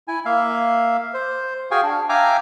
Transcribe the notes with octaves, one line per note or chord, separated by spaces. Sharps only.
E4 G#5
A#3 E5 F5
C5
F#4 G#4 F5 G5 G#5 C#6
D4
E5 F5 G5 G#5 A#5 D6